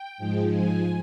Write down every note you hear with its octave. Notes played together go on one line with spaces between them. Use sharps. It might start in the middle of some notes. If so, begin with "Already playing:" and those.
Already playing: G5
G#2 F3 G#3
G#5